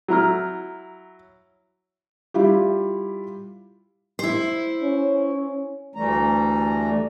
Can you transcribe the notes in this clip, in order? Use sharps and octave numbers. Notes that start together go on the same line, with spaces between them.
F#3 E4 A#5 F6
G3 E4 F4 G4
E4 C5
C#4
D2 E3 G3 A3 A#5